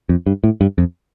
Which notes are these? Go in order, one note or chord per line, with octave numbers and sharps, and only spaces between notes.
F2
G2
A2
G2
F2